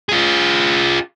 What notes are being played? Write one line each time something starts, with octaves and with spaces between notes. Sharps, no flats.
F4 G#4